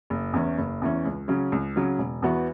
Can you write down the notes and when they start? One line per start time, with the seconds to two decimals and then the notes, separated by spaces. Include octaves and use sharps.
0.10 F#1
0.34 E2 E3 C#4
0.58 F#1
0.82 E2 E3 C#4
1.05 C#2
1.28 C#3 F#3 C#4
1.52 C#2
1.76 C#3 F#3 C#4
1.98 E1
2.22 E2 E3 B3 F#4